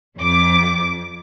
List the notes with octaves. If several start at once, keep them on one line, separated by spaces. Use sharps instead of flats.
F2 D6